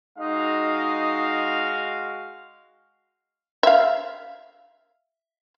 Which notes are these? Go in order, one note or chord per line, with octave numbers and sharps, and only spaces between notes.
G#3 D#4 F#4 F5
E5 F5